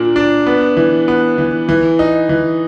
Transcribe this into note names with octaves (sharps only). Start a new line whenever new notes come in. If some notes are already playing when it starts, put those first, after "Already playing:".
Already playing: A#2 A#3 D4
D4
B3
E3
B3
E3
E3
D#4
E3